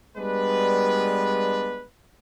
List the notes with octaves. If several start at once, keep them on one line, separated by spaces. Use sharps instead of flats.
G3 G#3 B3 D4 B4